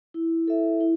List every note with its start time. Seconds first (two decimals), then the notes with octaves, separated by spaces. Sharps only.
0.14 E4
0.47 A4 E5
0.81 E4